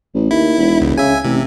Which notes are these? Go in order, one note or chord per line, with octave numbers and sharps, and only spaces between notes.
A1
D#2 E4
E1
C#2
C#3 E5 G#5
A1 C3